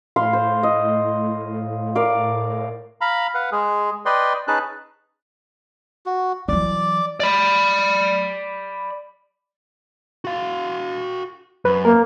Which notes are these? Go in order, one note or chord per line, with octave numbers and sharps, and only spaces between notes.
A2 F5 B5 C6
C5
D#5
A#4 D5 F5
F5 A#5 B5
B4 F5 F#5
G#3 G#4
B4 D5 D#5 G5 C6
C#4 D#4 G#4 B4 A5 F#6
F#4
E3 F#3 D5 D6
D5 B5
F#4 F5
F#2 B4
A#3 A#4